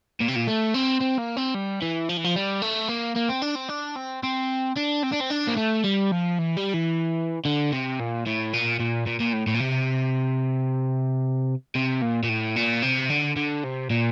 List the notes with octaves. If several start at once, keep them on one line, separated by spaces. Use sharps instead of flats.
A#2
C3
A#2
A3
C4
C4
A#3
C4
G3
E3
F3
E3
F3
G3
A3
A#3
A#3
C4
D4
C4
D4
C4
C4
D4
C4
D4
C4
D4
A#3
A3
G3
F3
E3
G3
E3
D3
C3
A#2
A2
A#2
A#2
A#2
A#2
A2
A2
A#2
C3
C3
A#2
A#2
A2
A#2
C3
D3
D3
C3
A#2